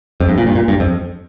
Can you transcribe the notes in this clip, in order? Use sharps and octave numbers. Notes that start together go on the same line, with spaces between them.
F2
G2
A#2
G2
A#2
G2
F2